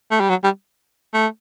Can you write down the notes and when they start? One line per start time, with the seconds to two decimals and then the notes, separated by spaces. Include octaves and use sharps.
0.11 A3
0.20 G3
0.29 F#3
0.44 G3
1.14 A3